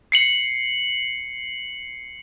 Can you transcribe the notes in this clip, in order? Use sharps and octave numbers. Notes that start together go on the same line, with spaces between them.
C7 C#7 F#7